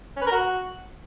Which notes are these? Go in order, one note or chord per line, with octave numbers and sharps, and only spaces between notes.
C#4
B4
A#4
F#4